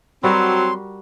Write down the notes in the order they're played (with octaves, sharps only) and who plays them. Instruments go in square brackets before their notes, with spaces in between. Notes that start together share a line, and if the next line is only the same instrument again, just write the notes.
[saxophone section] F#3 C4 [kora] G3 F#4 A#4 [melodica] C6